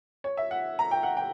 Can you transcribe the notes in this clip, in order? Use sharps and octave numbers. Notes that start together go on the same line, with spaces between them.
C#5
E5
F#5
A#5
G5
F#5
G5